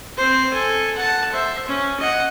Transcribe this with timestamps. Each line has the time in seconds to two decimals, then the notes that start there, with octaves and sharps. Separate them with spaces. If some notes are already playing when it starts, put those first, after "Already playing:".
0.17 C4 C5
0.52 A4 G#5
0.96 F#5 A5
1.31 C5 E5
1.68 C#4
1.99 D#5 F#5